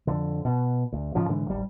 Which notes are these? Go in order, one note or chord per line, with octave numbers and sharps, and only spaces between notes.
F2 D3
B2
D2
G#2 C#3 F3
G#2 D3 E3 G#3
D1 G#1 G3